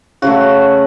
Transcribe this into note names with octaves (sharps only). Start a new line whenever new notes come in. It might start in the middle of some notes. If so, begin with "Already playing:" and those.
C#3 F#3 A3 F#4